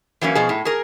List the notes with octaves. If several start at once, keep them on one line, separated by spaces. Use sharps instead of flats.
E3 F#3 A#3 C#4
B2 F3 G#4
A2
G#4 A#4